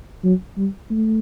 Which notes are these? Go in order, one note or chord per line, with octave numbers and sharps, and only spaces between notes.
F#3
G3
A3